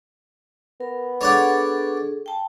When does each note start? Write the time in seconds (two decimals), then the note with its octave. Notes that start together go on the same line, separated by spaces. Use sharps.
0.81 B3 A#4
1.21 D4 G#4 A4 C#5 D5 F#5
2.26 G5 A5